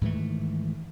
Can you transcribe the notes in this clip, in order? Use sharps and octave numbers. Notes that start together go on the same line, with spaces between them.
G#2 D#3 E3 A3